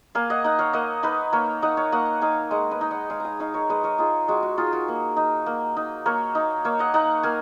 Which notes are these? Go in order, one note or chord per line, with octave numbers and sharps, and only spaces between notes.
A#3 F5 G#5
D#5 F#5
D#4 D#5 F#5
C#5 F5
A#3 D#5 F#5
D#4 B4 D#5
A#3 A#4 C#5
D#4 D#5 F#5
C#5 F5
A#3 D#5 F#5
D#4 F5 G#5
G#3 D#5 F#5
B4 D#5
D#4
D#5 F#5
G#3 F5 G#5
F5 G#5 A#5
D#4 C#5 F5
A#4 C#5
G#3 B4 D#5
A#4 C#5
D#4 F4 G#4
G#3 F#4
F#4
D#4 F4 G#4
F#4 A#4
A#3
D#4
A#3
D#4
A#3 A#4 C#5
D#4
A#3 C#5 F5
D#5 F#5
D#4 F#5 A#5
A#3 F5 G#5